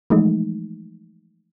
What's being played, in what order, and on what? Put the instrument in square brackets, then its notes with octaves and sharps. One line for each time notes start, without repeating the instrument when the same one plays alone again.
[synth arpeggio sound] E3 F3 G#3 A3 D#4